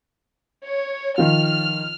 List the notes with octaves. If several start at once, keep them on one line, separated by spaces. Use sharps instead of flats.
C#5
D#3 F3 F4 F6